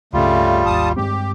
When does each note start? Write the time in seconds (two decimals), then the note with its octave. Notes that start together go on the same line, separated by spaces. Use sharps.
0.13 C#2 G2 C#3 G3 A3 F4
0.66 G#1 D#2 A5 D#6
0.96 G2 G#3 C4 G4